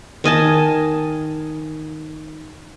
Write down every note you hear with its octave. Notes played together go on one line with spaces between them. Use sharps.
D#3 D#5 G#5 A5